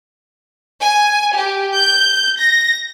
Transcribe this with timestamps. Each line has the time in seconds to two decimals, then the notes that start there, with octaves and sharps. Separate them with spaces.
0.79 G#5
1.37 G4
1.74 G6
2.39 A#6